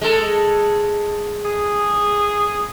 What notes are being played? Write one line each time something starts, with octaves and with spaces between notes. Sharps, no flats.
G#3 A4
G#4